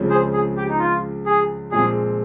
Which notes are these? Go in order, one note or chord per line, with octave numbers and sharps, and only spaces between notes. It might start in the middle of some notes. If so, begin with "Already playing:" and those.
Already playing: C#2 C#3 F3 G#3 C4
G#4 C5
G#4
G4
D#4
F4
G#4
A#2 F3 G#3 C4 G#4